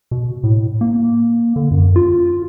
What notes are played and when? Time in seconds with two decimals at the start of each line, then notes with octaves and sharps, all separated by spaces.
0.11 B2
0.44 A2
0.81 A#3
1.56 D3
1.71 F#2
1.96 F4